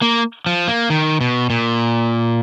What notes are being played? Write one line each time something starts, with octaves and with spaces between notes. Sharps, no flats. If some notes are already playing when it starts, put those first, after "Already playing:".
A#3
F3
A#3
D#3
B2
A#2